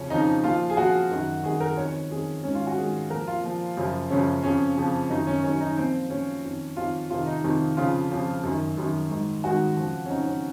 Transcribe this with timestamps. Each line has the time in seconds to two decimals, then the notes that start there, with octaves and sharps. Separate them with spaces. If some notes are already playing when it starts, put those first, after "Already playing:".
Already playing: F2 C#3 F3 C#4
0.10 F2 C#3 F3 D#4
0.43 A#2 F3 F4
0.70 G#4
0.77 A#2 F3 F#4
1.11 F#2 D#3
1.44 F#2 D#3 G#4
1.61 A#4
1.77 F2 D#3 C#5
1.88 C#5
2.11 F2 D#3 G#4
2.43 G#2 D#3 C#4
2.55 F4
2.67 F#4
2.77 G#2 D#3 G#4
3.10 A#2 F3 A#4
3.27 F4
3.43 A#2 F3
3.77 F#2 C#3 F3
4.10 F#2 C#3 F3 C#4
4.43 F2 C#3 F3 C#4
4.77 F2 C#3 F3
5.10 F#2 D#3 D#4
5.27 C#4
5.44 F#2 D#3 C#4
5.60 D#4
5.77 A#2 F3 C4
6.10 A#2 F3 C#4
6.44 F2 D#3
6.77 F2 D#3 F4
7.10 F2 C3 D#3 F4
7.27 D#4
7.44 F2 C3 D#3
7.77 F2 C#3 F3 F4
8.11 F2 C#3 F3
8.43 F#2 D#3
8.77 F#2 D#3
9.10 G#2 D#3
9.44 G#2 D#3 F#4
9.77 F2 C#3 F3
10.06 C#4
10.10 F2 C#3 F3 D#4
10.26 C#4